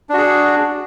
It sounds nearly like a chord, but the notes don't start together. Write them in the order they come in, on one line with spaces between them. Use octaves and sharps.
D4 F#4 G#4